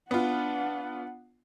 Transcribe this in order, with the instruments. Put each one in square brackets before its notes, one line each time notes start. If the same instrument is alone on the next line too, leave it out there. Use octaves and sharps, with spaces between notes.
[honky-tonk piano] B3 F4 [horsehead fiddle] D4 F#5